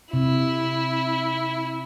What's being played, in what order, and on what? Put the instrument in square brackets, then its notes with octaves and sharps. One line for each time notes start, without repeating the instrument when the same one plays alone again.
[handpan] C3 [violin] E4